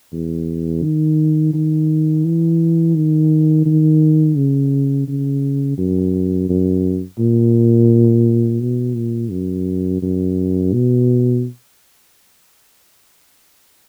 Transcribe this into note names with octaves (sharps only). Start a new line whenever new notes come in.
E2
D#3
D#3
E3
D#3
D#3
C#3
C#3
F#2
F#2
A#2
B2
A#2
F#2
F#2
B2